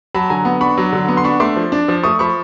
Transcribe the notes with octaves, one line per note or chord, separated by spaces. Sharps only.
F#3 A5 B5
D3 G#5 A#5
B3
D4 B5 C#6
F#3
D3
B3
C6
D4 B5 C#6
A3 C6 D6
F3
D4
F3
A3 C#6 D#6
F3 B5 C#6